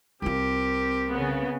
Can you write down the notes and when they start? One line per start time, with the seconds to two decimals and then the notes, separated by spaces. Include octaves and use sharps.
0.22 C2 C4 F4 G4 A#4
1.11 C#3 B3